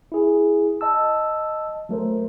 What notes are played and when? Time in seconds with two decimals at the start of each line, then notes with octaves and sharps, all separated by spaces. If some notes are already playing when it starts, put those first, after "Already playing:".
0.12 E4 G#4
0.81 D#5 A5 E6
1.89 F#3 A3 A#4 C5